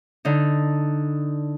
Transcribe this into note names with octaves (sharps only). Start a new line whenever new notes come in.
D3 D#4